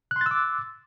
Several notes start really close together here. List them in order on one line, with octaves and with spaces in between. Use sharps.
F#6 C6 A6 E6 D6